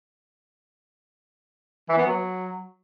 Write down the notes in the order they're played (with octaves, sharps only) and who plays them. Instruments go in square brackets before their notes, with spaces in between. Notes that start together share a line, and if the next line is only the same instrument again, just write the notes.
[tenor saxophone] E3
B3
F#3